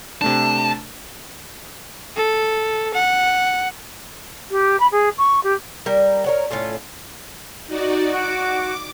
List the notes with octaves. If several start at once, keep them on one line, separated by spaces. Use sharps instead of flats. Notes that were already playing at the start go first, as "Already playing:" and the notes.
C3 A3 D4 A5
A4
F#5
G4
B5
G#4
C#6
G4
G3 A#4
A#4 C#5 F#5
A2 C#4 F4 A4
D#4 F#4 D5
F#4 D6